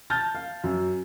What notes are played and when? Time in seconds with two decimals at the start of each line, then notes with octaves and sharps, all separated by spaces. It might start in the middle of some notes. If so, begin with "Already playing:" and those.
0.10 A5 F6 G6 A6
0.35 F5
0.64 F#2